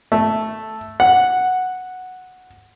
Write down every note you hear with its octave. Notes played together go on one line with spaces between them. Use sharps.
A3
F#5